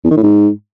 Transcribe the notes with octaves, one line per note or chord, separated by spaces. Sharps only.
E2
D#3
A2
G#2